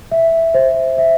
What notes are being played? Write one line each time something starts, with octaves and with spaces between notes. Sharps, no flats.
E5
C5
E5